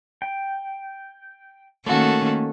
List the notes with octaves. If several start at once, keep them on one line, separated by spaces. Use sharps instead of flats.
G5
D#3 A3 A#3 C#4 F#4 A4